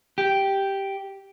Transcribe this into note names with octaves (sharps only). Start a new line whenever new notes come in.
G4